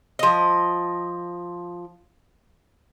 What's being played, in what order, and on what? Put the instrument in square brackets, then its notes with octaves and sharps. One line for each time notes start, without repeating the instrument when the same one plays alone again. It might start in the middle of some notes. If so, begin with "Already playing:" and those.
[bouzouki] F3 D#5